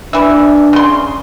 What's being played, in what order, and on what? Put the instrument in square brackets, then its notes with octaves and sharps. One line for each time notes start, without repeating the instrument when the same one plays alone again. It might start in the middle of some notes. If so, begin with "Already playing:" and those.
[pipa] E3 E5 [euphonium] D4
[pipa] C#3 C6